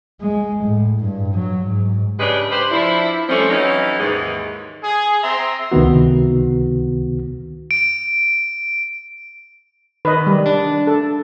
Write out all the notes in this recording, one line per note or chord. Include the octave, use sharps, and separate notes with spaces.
G#3
A2
G2
F#3
G#2
C#3 G#3 D4 G4 B4
G4 B4 C5
F3 D4 E4
F3 G3 A3 C4 C#4
E3 F#3 C#4 D#4
D#2 G#2 E3 G#3 D#4
G#4
C4 E5 A#5 C6
C#2 C3 D#3 B3 F#4
D7
D#3 B4 D#5
G3
D4
A4